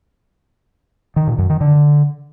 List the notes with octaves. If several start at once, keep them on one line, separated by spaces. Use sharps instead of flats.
D#3
A#2
F#2
D#3
D3